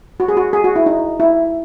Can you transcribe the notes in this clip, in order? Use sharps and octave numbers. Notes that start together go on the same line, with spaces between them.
F#4
G#4
F#4
G#4
F#4
E4
D#4
E4